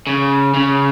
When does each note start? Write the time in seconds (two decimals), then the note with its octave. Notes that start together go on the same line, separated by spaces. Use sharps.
0.07 C#3
0.54 C#3